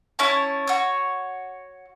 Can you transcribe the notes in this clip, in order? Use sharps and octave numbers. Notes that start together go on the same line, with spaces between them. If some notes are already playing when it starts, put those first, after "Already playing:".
C#4 E4 C#5 A5
F#4 C#5